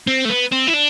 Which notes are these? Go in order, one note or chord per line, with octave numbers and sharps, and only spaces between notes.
C4
A3
B3
C4
E4
D4